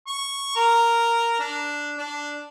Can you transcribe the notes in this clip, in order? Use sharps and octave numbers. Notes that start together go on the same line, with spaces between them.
C#6
A#4
D4
D4